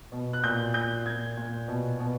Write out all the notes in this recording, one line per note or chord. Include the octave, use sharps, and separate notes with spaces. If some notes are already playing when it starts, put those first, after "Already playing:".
B2
F#6
A#2 G6
A#2 G6
A#2 G#6
A#2
B2
B2